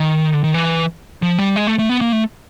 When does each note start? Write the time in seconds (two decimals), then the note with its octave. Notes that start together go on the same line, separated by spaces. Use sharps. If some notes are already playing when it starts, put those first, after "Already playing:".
Already playing: D#3
0.33 D3
0.44 D#3
0.54 E3
1.22 F3
1.39 G3
1.56 G#3
1.67 A3
1.79 A3
1.89 B3
2.01 A#3
2.12 A3